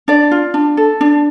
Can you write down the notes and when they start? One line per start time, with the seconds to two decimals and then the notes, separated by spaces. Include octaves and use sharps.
0.08 D4 D5
0.31 F4
0.54 D4
0.77 A4
1.01 D4